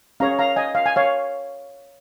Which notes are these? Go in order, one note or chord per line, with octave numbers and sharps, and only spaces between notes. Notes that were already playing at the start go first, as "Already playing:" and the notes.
C#4 G#4 C#5 F5 A#5
F5 A#5
D#5 G#5
F5
G#5
C#5 F5